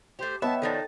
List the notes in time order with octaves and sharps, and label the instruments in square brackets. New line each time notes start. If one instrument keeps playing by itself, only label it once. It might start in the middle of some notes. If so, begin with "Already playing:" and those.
[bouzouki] A3 G4 [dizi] C5
[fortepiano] B3 [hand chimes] C#5 D#5 G5 [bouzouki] E5 [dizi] A5
[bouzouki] D#3 F3 D4 [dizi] D#4 [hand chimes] A4 A6